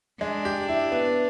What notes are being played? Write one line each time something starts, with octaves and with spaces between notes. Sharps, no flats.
G#3 D4
G4
E4
B3